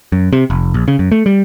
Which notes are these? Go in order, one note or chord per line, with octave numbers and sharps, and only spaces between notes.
F#2
C3
F1
A#1
C#3
F#2
A3
G3